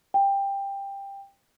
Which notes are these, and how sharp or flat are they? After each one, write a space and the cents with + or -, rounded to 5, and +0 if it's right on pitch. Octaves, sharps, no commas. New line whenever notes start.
G5 +15